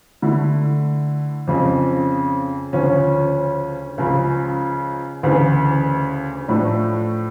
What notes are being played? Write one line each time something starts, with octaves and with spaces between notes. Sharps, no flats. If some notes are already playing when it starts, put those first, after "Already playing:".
D3 A3 E4
F2 C#3 F3
D2 C#3 F3 C#4
C#2 C#3 F3
D2 C#3 E3
A2 F3 A3 D4